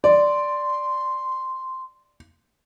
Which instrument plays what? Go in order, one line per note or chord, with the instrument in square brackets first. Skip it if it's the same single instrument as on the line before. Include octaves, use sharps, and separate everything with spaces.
[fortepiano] D5 [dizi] C6